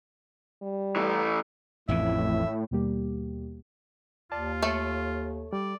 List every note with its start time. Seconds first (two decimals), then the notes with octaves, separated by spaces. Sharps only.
0.62 G3
0.96 E3 A3
1.88 A1 F2 A2 E3 E5
2.71 D#2 B2 G3 A#3 G4
4.32 D#2 F4 D5 A5
4.63 A3 A4 C#5
5.53 G3 D5